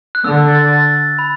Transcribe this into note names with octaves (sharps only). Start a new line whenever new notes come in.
F#6
D3 E6
A6
A6
B5